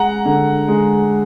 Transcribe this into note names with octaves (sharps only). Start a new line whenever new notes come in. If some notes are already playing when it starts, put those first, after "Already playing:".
Already playing: G#3 F#5 A#5
D3
G#3